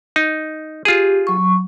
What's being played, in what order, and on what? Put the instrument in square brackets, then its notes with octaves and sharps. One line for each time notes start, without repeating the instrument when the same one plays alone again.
[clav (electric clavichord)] D#4
[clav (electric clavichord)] F4 G#4 [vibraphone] G4
[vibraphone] F#3 C#6